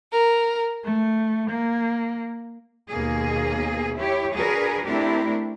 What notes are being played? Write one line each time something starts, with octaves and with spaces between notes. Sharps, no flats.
A#4
A3
A#3
D#2 B2 A#3 G#4
E4 G4 C#5
D4 F#4 G#4 A#4 B4
A3 C4 D4 E4 G4 A#4